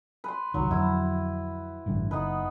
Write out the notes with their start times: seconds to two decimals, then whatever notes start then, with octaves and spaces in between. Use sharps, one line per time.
0.24 B4 C6
0.54 F#1 C2 D#3 F#3
0.71 F2 D3 F#3 E4
1.86 A1 G2 D3
2.11 F#1 B3 D#4 B4